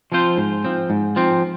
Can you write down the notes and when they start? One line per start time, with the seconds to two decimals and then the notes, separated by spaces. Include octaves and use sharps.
0.12 F3 C4 F4 C5
0.37 G#2
0.65 F3 C4
0.90 G#2
1.16 F3 C4